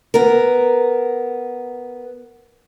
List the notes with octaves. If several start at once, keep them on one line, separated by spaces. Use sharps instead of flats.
B3 A#4